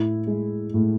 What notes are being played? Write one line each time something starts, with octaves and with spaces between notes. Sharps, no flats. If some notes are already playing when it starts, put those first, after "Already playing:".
Already playing: A2 E4
G#3
A2